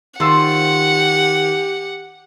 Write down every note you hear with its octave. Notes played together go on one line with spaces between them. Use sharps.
D#3 F4 G4 C5 D5 F#5 E6